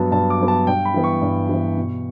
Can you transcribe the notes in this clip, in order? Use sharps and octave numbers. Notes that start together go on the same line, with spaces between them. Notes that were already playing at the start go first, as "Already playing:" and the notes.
Already playing: G2 F#3 B3 A5
G2 A5
D6
F#3 B3
A5
G2 G5
B5
E3 B3
C#6
G2
E3 B3
B2